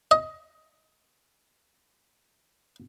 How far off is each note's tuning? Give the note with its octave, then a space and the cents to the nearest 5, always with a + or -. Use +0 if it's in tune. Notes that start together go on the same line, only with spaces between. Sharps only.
D#5 +20